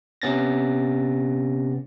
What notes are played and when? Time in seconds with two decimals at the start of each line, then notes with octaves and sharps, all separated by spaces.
0.22 C3 B3 C#4 A6 A#6